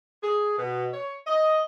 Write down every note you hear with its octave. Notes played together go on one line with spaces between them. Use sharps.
G#4
B2
C#5
D#5